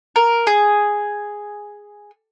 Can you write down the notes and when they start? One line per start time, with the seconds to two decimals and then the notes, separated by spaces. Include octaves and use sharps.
0.16 A#4
0.47 G#4